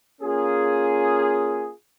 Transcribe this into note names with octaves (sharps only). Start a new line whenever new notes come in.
A#3 C#4 F4 G#4